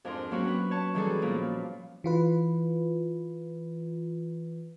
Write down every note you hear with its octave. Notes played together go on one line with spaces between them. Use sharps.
F2 G#2 D4 A#4 C6
F#3 A#3 C4 C#4 F#4
B3 B4
C#5 A5
D#3 E3 G3 F#4 G#4 A4
A#2 F3 G3 A#3 B3
E3 F4 B4